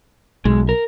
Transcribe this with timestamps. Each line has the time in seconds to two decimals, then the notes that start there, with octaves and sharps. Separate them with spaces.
0.45 B1 G#3
0.69 A#4